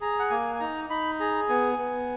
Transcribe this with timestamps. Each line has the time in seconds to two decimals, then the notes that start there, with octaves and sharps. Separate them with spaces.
0.01 G#4 A#5
0.19 F#5
0.30 A#3 G#5
0.55 G#5
0.60 D#4 A#5
0.90 D#4 B5
1.20 G#4 A#5
1.49 B3 G#5
1.78 B3